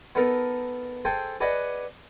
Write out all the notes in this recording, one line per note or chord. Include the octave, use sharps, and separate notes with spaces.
B3 D#4 A4 A#4
G#4 A4 C5 G5
G#4 B4 D5 D#5 F#5